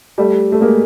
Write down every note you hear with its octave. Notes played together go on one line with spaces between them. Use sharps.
G3 A3
A3
G#3 A#3